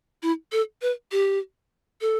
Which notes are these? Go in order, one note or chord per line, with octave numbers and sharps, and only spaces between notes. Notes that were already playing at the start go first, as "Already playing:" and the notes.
E4
A4
B4
G4
A4